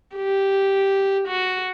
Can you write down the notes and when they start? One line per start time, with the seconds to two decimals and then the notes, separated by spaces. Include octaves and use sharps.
0.16 G4
1.28 F#4